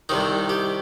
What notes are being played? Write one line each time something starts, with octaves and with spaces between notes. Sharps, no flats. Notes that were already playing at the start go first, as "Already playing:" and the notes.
C2 C3 D#3 D#4
G4